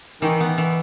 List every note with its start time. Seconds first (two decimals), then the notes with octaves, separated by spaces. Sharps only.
0.22 D#3 E3
0.40 B3
0.58 E3